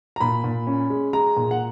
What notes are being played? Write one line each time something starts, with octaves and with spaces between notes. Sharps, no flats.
A#5
A#2 B5
A#2
C#4
G#3
G#3 A#5
A#2
F#5